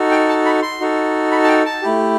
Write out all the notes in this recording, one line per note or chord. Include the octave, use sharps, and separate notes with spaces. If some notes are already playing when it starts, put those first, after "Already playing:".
Already playing: D#4 F#4 A4
G5
A5
B5
C6
D#4 F#4 A4
B5
A5
G5
A5
A3 E4 G4